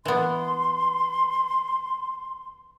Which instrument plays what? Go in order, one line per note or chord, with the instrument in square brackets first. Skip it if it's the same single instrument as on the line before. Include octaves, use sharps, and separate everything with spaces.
[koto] E3 B3 [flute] C6